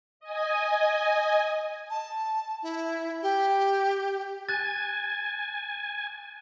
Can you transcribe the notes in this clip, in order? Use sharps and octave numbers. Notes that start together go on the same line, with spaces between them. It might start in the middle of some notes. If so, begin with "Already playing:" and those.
D#5 G#5
A5
E4
G4
G#5 F#6 A6